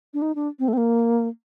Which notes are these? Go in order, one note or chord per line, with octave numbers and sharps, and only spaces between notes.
D4
D#4
D4
C4
A3
C4
A#3